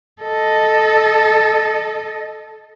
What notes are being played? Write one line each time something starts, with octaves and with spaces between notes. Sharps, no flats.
A4 D#5